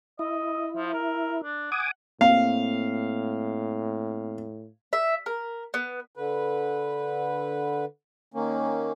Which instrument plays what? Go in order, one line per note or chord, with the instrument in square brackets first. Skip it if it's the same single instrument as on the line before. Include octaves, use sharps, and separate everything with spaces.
[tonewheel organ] E4 [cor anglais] D#5
[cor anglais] F3
A#4
D4
[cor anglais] F#5 [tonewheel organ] G#5 D6 D#6
[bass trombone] A2 [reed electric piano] A#3 C4 [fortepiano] F5
[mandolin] E5
A#4
B3
[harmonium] D3 B4
D#3 A#3 C#4